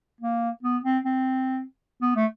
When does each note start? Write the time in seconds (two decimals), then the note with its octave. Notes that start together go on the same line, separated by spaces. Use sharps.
0.21 A#3
0.63 B3
0.84 C4
1.05 C4
2.02 B3
2.16 A3